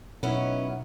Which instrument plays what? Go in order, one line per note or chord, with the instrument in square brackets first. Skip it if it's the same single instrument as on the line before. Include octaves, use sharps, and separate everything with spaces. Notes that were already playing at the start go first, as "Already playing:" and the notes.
[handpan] B2 D#4 [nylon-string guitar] F#3 E4 [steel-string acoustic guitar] B3 C#4